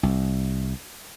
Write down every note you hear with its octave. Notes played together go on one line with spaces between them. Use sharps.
C2